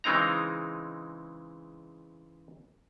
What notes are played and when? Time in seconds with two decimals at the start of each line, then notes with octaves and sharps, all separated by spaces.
0.04 C#3 E3 G#3 C4 D#4 A#5